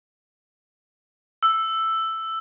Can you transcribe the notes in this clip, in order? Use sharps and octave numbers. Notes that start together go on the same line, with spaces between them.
E6